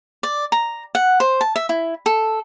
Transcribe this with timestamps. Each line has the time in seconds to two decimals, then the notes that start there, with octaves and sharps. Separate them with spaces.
0.23 D5
0.52 A#5
0.95 F#5
1.20 C5
1.41 A5
1.56 E5
1.69 E4
2.06 A4